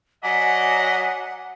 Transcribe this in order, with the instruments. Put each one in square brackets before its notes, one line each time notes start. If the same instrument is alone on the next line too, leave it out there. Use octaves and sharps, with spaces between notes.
[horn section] F#3 D5 D#5 [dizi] F#5 [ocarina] G#5 [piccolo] B6